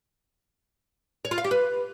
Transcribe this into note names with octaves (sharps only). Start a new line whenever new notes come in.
C#5
F4
F5
G4
B4